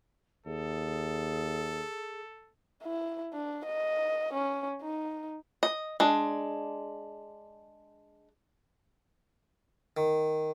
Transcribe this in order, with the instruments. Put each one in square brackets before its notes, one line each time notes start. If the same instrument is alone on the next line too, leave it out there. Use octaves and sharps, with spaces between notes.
[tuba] D#2 [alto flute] G#4 [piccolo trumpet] A4
[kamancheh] E4
D4
D#5
C#4
D#4
[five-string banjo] D#5
G#3 D4
[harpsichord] D#3